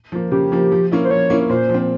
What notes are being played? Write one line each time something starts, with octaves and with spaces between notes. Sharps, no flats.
F3 A#3
C#3 G4
F3 A#3
F3
A#3 C#4 E4
C5
F3 C#5
A#3 C#4 E4
A#2 C5
F3 C4